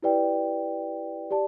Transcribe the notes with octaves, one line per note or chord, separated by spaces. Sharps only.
E4 G4 B4 D5 G5
G4 D5 A5